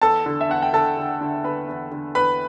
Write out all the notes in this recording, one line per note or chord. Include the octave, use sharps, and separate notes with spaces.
E2 A4 A5
D3
E5
E2 F#5
G5
D3 A4 A5
D3
D3
D3 B4 B5
E2
D3
E2 B4 B5